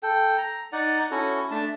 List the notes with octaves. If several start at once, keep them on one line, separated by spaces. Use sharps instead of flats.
A4 G5
A#5
D#4 D5 F#5
C#4 E4 F#4 A4
A3 D4 A5